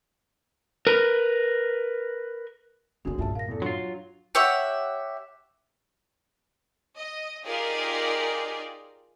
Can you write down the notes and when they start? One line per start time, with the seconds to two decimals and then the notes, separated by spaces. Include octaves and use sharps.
0.87 A#4 B4
3.05 F#2 D3 E3 A#3 F#4 G#4
3.19 G2 A#2 F4 E5 A5
3.35 A#4 F5 A#6
3.48 E2 A4
3.62 F#3 D4 F4 C6
4.35 G4 C#5 E5 F#5
6.95 D#5
7.45 D#4 F4 G4 G#4 A#4 D5